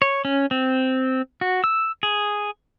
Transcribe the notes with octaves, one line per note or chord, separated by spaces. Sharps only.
C#5
C#4
C4
F#4
E6
G#4